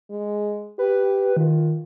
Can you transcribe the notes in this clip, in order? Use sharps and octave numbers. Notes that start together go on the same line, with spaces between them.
G#3
G4 B4
D#3 F4